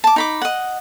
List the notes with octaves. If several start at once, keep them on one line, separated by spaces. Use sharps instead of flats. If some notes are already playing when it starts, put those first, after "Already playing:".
A5 D6
D#4 B5 D6
D#5 F#5